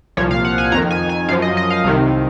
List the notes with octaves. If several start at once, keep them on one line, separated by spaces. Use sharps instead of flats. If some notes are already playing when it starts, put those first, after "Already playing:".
C2 A#2 F3 C#5
F5
F#5
G#5
F2 D#3 A#5
G#5
G#5
F#2 F3 F5
D#5
D#5
F5
C2 C3 D#3